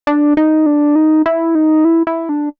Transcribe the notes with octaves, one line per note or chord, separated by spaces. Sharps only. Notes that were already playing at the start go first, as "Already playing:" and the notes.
D4
D#4
D4
D#4
E4
D#4
E4
E4
D4